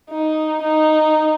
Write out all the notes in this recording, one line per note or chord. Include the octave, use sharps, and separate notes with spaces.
D#4
D#4